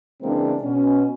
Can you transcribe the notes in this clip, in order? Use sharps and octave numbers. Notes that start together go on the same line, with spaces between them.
C#3 E3 G#3 A#3 C4 D4
B2 C#4